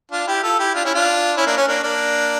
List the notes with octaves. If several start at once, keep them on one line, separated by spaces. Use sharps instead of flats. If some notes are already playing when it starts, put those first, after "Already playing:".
D4 F4
E4 G4
F4 A4
E4 G4
D4 F4
C#4 E4
D4 F4
C#4 E4
A#3 D4
C#4
A#3 D4
A#3 D4